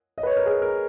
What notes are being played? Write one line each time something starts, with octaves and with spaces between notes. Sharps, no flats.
D#5
B4
C#5
A#4
G#4
A#4